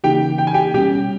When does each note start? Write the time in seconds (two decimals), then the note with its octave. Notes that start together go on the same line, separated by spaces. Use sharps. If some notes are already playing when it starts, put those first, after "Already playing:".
0.04 C#3 E3 A#3 D#4 G4 G5
0.38 G5
0.47 G#5
0.54 G4 G5
0.74 B2 G3 C#4 G4 G5